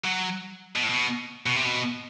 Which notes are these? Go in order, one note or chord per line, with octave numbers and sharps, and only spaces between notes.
F#3
B2
A2
B2
B2
C3
B2